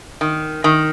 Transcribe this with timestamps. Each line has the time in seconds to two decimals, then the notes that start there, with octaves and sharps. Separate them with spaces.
0.21 D#3
0.64 D#3